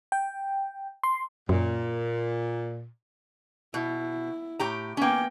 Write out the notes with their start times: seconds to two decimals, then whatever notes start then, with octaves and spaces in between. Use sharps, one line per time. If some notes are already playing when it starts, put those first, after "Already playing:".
0.12 G5
1.03 C6
1.49 F#2 A#2
3.74 B2 E4
4.59 A2 G4 A#5
4.97 A#3 B3 C#4 G5